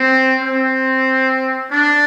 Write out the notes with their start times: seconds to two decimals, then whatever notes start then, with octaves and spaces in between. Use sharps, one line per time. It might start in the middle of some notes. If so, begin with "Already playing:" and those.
Already playing: C4
0.42 C4
1.71 D4